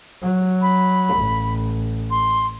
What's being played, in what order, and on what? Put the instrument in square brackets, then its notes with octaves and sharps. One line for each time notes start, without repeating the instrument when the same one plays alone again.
[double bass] F#3
[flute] B5
[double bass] A1
[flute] C6